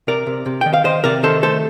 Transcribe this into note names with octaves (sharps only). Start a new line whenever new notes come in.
C3 A#4 D5
C3
C3
D#3 G5
F5
D#3 C5 D#5
C3 A#4 D5
D#3 A4 C5
A3 A4 C5